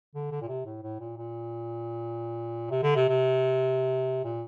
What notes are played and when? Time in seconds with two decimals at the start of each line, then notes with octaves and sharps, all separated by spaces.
0.15 D3
0.31 D3
0.42 A#2
0.48 C3
0.65 A2
0.83 A2
1.00 A#2
1.17 A#2
2.71 C3
2.83 D3
2.96 C3
3.09 C3
4.25 A#2